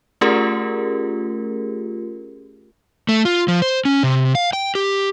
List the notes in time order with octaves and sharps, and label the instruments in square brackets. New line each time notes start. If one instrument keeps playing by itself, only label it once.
[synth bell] A3 C#4 F4 G4 G#4 A#4
[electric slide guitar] A3
F4
F3
C5
C#4
C3
F5
G5
G4